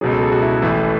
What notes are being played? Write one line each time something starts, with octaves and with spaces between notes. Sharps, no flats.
C#2 B2 F#3 G#4
A4
G#4
F#4
E4
A1 A2 E3 A3